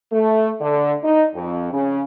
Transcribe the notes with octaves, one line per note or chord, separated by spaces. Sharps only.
A3
D3
D#4
F2
C#3